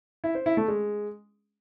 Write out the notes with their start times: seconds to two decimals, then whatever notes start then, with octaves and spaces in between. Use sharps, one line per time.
0.24 E4
0.35 C5
0.46 E4
0.57 A3
0.68 G#3